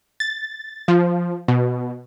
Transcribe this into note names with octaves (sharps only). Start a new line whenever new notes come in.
A6
F3
B2